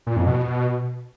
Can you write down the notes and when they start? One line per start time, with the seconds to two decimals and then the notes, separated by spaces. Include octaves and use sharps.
0.07 A#2
0.17 F2
0.27 B2